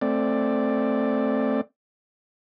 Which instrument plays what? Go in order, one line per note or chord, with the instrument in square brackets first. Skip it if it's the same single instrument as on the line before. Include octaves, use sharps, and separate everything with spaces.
[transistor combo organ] A3 C4 D5